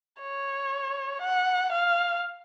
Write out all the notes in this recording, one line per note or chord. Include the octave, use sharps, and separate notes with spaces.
C#5
F#5
F5